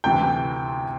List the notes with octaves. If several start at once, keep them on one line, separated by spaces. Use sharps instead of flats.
D2 C3 E3 G5